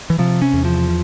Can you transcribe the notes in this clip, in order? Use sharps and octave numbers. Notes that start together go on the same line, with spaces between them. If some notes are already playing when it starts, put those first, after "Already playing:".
E3
C3 F3
C#4
E2
F3